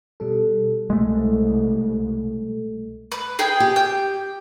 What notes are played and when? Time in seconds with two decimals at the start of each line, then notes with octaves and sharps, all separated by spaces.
0.20 B2 G3 A4
0.90 C2 G#3 A3
3.12 B4
3.39 G#4 D#5 G5
3.60 G4
3.76 G5